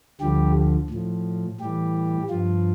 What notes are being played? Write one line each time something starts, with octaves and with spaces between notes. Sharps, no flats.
D2 D3 F3 G3 G4
A2 F3
A2 E3 G3 G4
G2 F3 F4